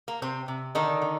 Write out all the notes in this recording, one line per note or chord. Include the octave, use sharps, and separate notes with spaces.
A#3
C3 C4
C3
D3 D#3 D#4
D3